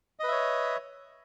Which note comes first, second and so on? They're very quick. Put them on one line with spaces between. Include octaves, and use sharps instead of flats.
D#5 B4 E5 C#5